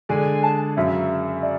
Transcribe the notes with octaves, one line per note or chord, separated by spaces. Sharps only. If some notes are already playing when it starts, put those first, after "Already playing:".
D3 G#3 D4 G#4 D5 G#5
A5
F#2 C#3 F#3 E5
D5